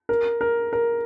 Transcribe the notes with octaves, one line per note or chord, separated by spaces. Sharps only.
A#4
A#4
A#4